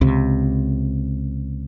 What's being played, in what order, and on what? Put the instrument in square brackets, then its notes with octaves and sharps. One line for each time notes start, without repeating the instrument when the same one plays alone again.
[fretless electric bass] C#2 C3